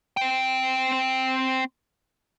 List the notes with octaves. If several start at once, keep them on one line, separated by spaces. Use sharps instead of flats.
C4 G5